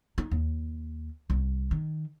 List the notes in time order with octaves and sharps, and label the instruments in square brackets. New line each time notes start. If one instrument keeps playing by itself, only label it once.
[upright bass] D#4
D#2
C2
D#3